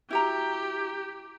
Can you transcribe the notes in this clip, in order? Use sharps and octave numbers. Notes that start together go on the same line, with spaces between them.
E4 F#4 G4 A#5